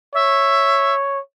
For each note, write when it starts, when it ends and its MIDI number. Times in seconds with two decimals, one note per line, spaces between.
0.14 1.19 73
0.14 0.95 76